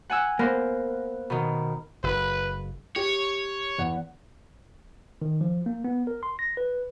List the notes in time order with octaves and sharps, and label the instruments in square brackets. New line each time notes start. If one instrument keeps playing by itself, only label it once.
[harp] F#5 G#5 E6
[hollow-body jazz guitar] A#3 [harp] B3 C5
[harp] B2 D#3
[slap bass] F#1 [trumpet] B4
[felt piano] G4 [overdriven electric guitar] C#5
[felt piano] E2 F#5
[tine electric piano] D#3
F3
A#3
B3
A#4
C6
A#6
B4